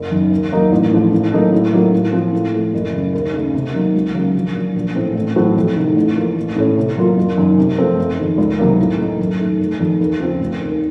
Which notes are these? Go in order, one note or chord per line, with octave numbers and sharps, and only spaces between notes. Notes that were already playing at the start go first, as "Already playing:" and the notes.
Already playing: F#1
F#2 D#3
D#2
D#3 F#3 A#3 D#4
A1
A2 F3
A2
F#3 A#3 D#4 A4
A2
F#3 A#3 D#4 F#4
A2
F3 C4 F4
A2
F3 A3
F#1
F#2 C#3
D#2
C#3 A3 D#4
C3
D#3 F#3 A#3 D#4
C#2
C#3 F#3 A#3
A#1
A#2 F#3
A#1
A2 A3 C4
A1
A2 F#3 C4 F#4
F2
C3 D#3 A3
A1
A2 F3 A#3
A1
A2 A3 C#4
C3
F#3 A#3 F4
F#1
F#2 D#3
C3
F3 A3 C4
F#1
F2 D#3
C#2
C3 D#3 F#3 A#3
A2
A3 D#4
F#2
D#3 A3
F1
F2 D#3
D#2
C#3 F3 C4 F4
F1
D#2 D#3